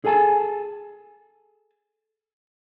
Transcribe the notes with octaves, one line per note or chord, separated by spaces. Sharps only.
G#4 A4 G#5 A5